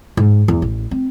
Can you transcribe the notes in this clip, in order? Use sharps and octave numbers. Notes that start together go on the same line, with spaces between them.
G#2
E2
A1
C4